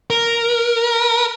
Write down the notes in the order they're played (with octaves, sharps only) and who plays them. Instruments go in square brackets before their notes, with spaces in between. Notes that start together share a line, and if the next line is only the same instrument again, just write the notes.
[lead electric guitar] A#4